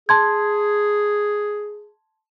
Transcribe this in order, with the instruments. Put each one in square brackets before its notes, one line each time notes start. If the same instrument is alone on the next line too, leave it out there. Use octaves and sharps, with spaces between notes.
[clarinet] G#4 [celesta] A5 C6 G#6